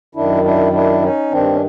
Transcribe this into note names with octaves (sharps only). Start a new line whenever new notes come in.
F#2 D#3 D4 E4
D4 E4
D4 E4
C#4 D#4
G2 D#3 C4 D4
C#4